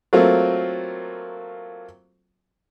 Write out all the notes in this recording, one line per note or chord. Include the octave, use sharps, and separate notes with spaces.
F#3 A3 A#3 C4 F4